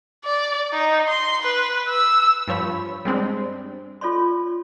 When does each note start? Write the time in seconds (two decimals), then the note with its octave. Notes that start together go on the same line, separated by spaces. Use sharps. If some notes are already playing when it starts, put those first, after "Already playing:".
0.24 D5
0.73 D#4
1.08 C6
1.41 B4
1.89 E6
2.48 G2 F3 C#5 B5
3.05 G3 G#3 C4 D4
4.01 F4 A4 C#5 D5 C6